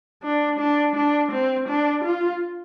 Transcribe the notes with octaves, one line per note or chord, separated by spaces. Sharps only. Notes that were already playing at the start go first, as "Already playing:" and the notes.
D4
D4
D4
C4
D4
F4